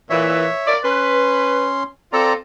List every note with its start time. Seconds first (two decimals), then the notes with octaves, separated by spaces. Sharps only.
0.10 A#2 E3 C#5 E5
0.67 F4 A#4 D5
0.84 C#4 B4 C6
2.13 C4 F4 A4 D5 A#5